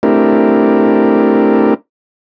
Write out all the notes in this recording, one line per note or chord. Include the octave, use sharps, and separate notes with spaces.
A3 C4 D4 E4 G4 A#4